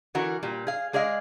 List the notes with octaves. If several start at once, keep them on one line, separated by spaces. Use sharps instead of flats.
D3 E3 F#4 A#4
A#2 G3
G#4 F5
G#3 G#4 D5 D#5 F5